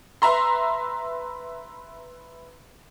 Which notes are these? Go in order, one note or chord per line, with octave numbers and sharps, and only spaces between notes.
B4 E5 A#5 C6